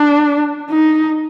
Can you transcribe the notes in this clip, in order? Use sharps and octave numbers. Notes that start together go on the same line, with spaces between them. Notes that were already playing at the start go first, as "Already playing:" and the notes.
Already playing: D4
D#4